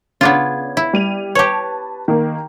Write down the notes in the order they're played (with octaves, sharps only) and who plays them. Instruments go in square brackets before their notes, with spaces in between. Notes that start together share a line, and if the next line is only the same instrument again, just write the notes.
[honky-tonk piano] C#3 G#6 [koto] B3 D4 F4
[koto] E4
[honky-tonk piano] G3 D#7 F7
[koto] G4 C#5 [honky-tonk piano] B4 A5
[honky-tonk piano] D#3 A#3